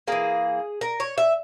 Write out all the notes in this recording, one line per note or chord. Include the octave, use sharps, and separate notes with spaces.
E3 A#3 G#4
A#4
C#5
E5